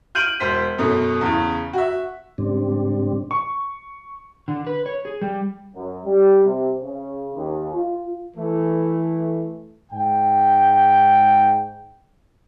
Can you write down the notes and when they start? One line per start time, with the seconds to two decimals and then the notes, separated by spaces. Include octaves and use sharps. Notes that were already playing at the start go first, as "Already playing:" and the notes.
0.15 F6 G6 D7 D#7 F#7
0.40 E1 C5 B6
0.78 F#2 B2 A3
1.21 E2 C#3
1.73 F#4 E5
2.38 G#2 C#3 G3 C4 D4
3.31 C#6
4.48 D3
4.67 B4
4.86 C#5
5.05 G#4
5.22 G3
5.74 F#2
6.04 G3
6.45 C3
6.80 C#3
7.35 D#2
7.73 F4
8.37 E3 A3
9.92 G#2 G5